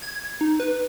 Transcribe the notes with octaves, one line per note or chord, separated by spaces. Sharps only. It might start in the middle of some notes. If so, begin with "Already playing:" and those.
G#6
D#4
B4